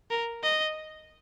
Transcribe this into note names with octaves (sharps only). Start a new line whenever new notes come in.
A#4
D#5